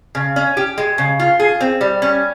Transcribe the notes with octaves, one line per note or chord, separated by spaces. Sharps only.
C#3
C#4
G4
G#3
C#3
F4
G#4
C4
G3
C#4